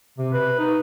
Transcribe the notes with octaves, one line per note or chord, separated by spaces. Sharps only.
C3
B4
D#4